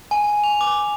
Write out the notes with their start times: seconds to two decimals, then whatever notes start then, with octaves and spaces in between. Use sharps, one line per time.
0.11 G#5
0.44 F7
0.61 D6